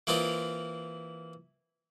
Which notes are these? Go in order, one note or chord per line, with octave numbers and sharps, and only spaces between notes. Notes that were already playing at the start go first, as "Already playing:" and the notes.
E3 A#3 C4 E4 F4 D#5